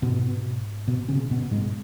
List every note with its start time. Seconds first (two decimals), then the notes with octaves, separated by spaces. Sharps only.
0.02 G#2 B2 B3
0.88 B2 B3
1.08 C#3 C#4
1.31 B2 B3
1.51 G#2 G#3